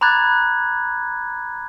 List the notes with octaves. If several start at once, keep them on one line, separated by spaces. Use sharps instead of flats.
A#5 B5 D6 F#6 G#6 A6